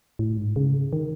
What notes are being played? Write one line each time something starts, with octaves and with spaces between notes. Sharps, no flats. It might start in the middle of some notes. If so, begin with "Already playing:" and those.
A2
G#2
C#3
D#3